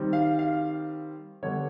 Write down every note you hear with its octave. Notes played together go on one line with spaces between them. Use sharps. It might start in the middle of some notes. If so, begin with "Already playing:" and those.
Already playing: D#3 G3 C4
F5
F5
D3 G3 B3 C#5